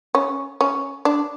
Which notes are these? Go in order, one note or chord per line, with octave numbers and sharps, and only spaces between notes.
C#4
C#4
D4